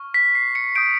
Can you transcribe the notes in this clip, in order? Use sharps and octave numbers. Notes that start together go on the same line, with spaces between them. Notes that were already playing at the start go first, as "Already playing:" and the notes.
Already playing: C#6 F6
B6
C7
C#7
D#6 G6 D7